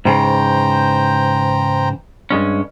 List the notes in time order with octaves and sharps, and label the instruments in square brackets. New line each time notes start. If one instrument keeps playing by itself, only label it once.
[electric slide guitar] G#2 C#3 E3 [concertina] C5 G5 A#5
[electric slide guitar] G2 G#3 C#4